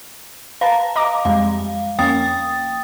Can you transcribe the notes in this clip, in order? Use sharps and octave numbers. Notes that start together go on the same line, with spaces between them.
B4 F5 A5 A#5
D#5 A#5 D6
F2 G3 G#3 F5
F2 A#3 C#4 G5 D#6 A6